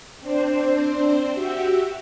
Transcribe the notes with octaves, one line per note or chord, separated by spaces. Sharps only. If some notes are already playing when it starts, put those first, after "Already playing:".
C4 D4 C5
F#4 G4 E5